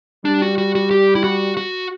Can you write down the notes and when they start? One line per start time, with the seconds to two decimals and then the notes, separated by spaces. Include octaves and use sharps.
0.25 G3 D4
0.42 F#4
0.58 F#4
0.75 F#4
0.91 G4
1.15 E4
1.24 F#4
1.57 F#4